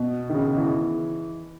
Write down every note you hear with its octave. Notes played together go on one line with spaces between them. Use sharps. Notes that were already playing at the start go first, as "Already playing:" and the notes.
Already playing: B2
D#3
C#3
E3